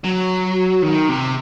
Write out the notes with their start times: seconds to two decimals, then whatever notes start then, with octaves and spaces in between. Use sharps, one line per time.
0.04 F#3
0.82 D#3
1.09 C3